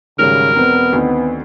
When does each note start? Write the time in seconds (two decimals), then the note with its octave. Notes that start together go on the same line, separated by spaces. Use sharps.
0.19 G#1 C#3 F#3 G3 A#4
0.55 E1 B3 C4 A#5
0.93 D2 D#3 C4